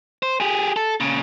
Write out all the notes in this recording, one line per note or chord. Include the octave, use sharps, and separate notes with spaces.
C5
G4 G#4
A4
A#2 C#3